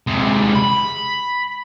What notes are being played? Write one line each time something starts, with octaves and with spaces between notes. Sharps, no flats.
C3 G#3
B5